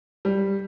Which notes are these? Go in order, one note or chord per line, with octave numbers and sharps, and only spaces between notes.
G3